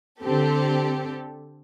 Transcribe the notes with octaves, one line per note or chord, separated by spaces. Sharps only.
D3 C4 G4 A4